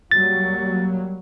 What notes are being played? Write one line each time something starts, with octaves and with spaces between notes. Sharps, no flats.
F#3 G3 A#3 A6